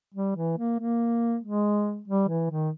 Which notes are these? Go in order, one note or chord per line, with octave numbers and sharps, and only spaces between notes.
G3
E3
A#3
A#3
G#3
G3
E3
D#3